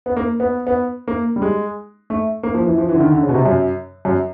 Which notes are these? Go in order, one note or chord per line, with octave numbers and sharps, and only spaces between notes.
B3
A#3
B3
B3
A#3
G3
G#3
A3
A#3
F3
E3
F3
E3
D3
D#3
D3
C#3
B2
C3
F#2
F#2